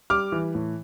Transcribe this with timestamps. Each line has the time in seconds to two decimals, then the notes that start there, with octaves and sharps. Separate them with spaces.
0.10 G3 D6 F6
0.32 E3
0.55 A2